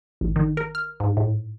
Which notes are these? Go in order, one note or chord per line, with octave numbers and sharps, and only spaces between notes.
A1
D#3
A#4
F6
G#2
A2